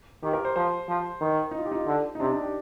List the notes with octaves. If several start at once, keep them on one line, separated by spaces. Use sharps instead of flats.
D#3 G4
A#4
C5
F3 C5
F3
D#3
D#4
F4
G4
D#4
F4
D3
D#4
C3 D4
D4
G4